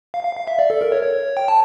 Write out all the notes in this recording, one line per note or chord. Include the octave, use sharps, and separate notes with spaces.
F5
F5
F5
E5
D5
A4
A#4
C#5
C#5
G5
A5